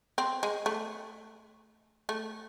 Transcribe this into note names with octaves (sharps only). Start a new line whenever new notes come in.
C4
G#3
A3
A3